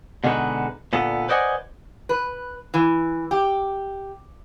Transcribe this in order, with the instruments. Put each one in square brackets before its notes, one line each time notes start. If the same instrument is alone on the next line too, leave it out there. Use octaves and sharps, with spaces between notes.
[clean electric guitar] B2 D3 G#3 D#4 F#4 B4
A#2 D3 B3 A4
B4 C5 D5 D#5 F#5 G#5
[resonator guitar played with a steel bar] B4
E3
G4